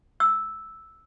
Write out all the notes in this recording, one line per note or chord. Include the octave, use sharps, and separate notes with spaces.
E6